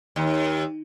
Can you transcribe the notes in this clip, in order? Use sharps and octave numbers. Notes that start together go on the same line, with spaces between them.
D#2